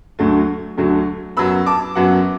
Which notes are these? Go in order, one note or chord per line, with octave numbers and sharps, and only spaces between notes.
D2 D3 F#3 A3
D2 D3 F#3 A3
F#2 F#3 B3 B5 E6
A5 D6
F#2 F#3 B3 F#5